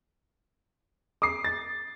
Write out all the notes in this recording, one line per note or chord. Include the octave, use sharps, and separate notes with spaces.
D6 D#6 C7
A6